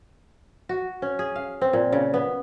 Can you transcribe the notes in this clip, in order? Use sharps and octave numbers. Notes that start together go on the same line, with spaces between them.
F#4
C#4
G#4
F5
C4
A#2
C#3
B3